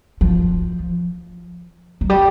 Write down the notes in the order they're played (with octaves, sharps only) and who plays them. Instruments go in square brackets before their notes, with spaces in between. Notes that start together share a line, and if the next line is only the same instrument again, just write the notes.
[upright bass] F3
F#3
G3